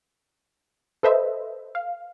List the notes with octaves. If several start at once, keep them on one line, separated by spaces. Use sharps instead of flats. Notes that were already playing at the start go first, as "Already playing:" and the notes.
A4 B4 C5 D#5 E5
F5